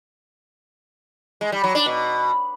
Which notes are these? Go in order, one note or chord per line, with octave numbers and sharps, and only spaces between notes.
G#3
G3
F#3
D4
B2